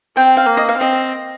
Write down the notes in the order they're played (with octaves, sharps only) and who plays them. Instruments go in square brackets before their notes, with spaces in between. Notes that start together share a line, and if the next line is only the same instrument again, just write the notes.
[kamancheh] C4 [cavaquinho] G5
[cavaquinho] F5
[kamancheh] A#3
[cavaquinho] D#5
F5
[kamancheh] C4 [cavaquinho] D#5